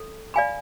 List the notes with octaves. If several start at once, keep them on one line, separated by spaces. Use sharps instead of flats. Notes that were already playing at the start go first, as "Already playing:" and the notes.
Already playing: A4
D5 F5 G#5 B5